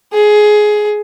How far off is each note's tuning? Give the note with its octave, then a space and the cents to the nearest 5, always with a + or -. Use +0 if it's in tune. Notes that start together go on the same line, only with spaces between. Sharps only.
G#4 +15